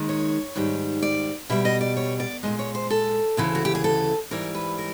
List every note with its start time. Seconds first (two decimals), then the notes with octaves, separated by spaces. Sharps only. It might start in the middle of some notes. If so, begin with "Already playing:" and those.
Already playing: D#2 D#3 G#3
0.09 C#5
0.56 G#2 D#3 G3
1.03 D5
1.50 B2 G3 E5
1.65 D#5
1.81 D5
1.97 C#5
2.20 D5
2.43 A#2 F3 G#3 D#5
2.59 C#5
2.75 C5
2.90 A4
3.37 D2 C#3 E3
3.55 F#4
3.65 G4
3.75 G#4
3.84 A4
4.31 G#2 E3 G3 A#4
4.55 B4
4.78 A#4